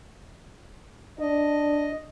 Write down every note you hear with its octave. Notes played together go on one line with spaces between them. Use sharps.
D4 D#5